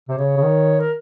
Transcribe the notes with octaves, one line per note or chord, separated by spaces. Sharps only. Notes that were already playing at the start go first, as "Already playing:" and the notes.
C3 C5
C#3 C#5
C#3
D#3
A#4